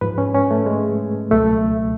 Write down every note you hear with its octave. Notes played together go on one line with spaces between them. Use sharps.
G#2 F3 B4
C#4
C#4
A3
G#3
C#2 B2 F#3 A3